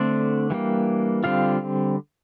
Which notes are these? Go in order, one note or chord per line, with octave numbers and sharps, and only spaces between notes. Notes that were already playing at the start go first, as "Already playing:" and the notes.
Already playing: D3 A3 C4 D4 D5
E3 G3 A#3
D3 G3 C4 F4 F5